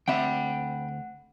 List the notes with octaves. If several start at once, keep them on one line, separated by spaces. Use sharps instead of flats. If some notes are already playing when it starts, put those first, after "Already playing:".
D2 C4 E5 F#5 G5 B5